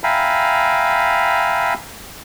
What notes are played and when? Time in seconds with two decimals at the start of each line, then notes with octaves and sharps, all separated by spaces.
0.04 E5 F5 G5 G#5 A#5 B5